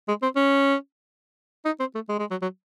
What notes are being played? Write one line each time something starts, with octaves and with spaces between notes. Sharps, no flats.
G#3
C4
C#4
D#4
C4
A3
G#3
G#3
F#3
F#3